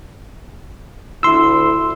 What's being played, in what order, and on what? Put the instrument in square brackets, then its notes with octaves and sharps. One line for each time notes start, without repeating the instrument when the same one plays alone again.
[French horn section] D2 E4 [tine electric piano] C6 E6